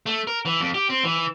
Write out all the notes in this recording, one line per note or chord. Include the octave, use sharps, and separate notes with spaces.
A3
A#4
E3
F2
G4
C4
E3